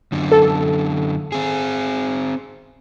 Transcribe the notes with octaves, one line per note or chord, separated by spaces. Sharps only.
F#2 D3
A4
C4 G#4